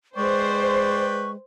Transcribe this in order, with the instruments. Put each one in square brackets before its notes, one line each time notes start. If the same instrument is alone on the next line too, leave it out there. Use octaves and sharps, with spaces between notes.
[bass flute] G#3 [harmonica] B4 D5 G5 [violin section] C5 [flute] C#6